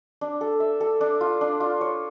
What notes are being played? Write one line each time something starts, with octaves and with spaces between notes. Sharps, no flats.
D4
A4
E5
A4
D4
F4
D4
F4
C#5